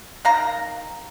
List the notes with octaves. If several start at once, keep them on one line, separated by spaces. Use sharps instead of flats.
D#3 F5 A#5